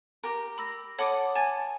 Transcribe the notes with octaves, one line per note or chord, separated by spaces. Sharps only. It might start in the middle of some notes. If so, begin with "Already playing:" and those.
G4 A#4
B5 E6 A#6
A4 C#5 F#5 B5 D6 D#6
G#5 A5 A6